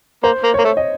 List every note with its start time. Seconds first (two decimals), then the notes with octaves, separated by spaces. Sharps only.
0.24 A#3 C5
0.43 A#3
0.54 A#3 C#5
0.64 A3
0.77 D#5